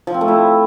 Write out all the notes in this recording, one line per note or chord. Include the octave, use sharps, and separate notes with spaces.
F3
C4
A3
E4